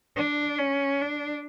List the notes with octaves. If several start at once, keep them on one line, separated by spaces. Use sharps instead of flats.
D4
C#4
D4